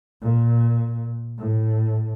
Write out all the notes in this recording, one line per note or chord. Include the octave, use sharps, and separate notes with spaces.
A#2
A2